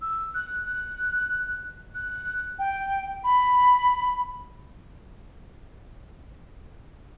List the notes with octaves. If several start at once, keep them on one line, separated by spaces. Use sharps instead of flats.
E6
F#6
F#6
F#6
G5
B5